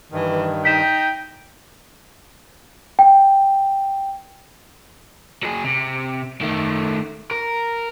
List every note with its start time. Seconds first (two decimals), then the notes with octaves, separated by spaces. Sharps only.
0.12 G2 D#3 E3
0.65 D#4 G5 B6 E7
2.99 G5
5.43 F#3 G#4
5.64 C3
6.41 D#3 A3
7.31 A#4